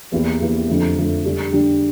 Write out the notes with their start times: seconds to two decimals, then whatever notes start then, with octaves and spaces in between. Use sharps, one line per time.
0.12 E2 E3 A#3 E4 G4
0.41 E2 E3 A#3 E4 G4
0.68 F2 D3 F3 A3
0.96 F2 D3 F3 A3
1.25 D3 G3 D4 G4
1.52 D3 G3 D4 G4